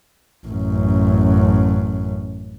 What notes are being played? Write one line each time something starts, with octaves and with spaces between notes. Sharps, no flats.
A1 F#2